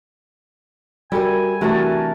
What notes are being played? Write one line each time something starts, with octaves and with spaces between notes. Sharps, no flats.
G3 F#4 A4 A#4 E5 G#5
C3 E3 A3 D4 F#4 A#4 C5 A5